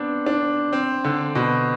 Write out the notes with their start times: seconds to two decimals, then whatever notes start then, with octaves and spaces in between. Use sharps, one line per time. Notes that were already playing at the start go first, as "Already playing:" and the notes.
Already playing: B3 C4 D4
0.26 D4
0.73 C4
1.04 D3
1.35 B2